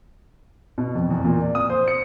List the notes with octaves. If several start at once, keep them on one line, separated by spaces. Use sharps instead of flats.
B2
F2
E2
A#2
D5
D#6
C5
C#7